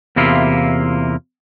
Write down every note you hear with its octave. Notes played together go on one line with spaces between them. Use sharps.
E2 C3 A#3 E4 F4